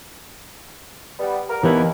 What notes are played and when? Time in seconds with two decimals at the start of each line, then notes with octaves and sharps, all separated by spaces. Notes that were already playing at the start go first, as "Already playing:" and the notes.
1.19 G3 B3
1.50 A#4
1.63 D#2 E3 B3 E4